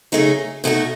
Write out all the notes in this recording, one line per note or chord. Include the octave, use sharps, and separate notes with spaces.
C#3 F#3 A3 D#4 G#4
B2 A3 D#4 F#4